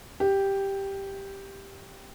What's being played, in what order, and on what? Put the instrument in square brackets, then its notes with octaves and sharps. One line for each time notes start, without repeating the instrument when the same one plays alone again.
[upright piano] G4